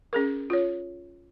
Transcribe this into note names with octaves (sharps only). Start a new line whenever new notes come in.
C#4 G#4 A#4
F4 C#5